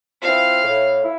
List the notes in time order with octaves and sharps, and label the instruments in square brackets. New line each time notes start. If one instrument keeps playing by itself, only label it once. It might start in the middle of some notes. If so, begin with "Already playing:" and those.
[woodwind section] F3 C4 E4 [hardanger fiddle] F5
[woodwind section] A2
E4